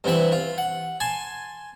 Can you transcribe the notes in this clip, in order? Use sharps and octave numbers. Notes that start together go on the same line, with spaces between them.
G2 C3 E3 E5 F#5
F4
F#5
G#5 A5 C6